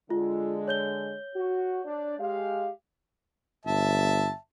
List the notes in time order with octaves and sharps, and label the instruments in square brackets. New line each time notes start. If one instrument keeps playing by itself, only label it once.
[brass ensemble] D3 G#3 [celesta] F4
[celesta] C#5 G6 G7
[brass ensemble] F#4
D4 D5
G#3 G4 F5
[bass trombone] G1 [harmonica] E5 A5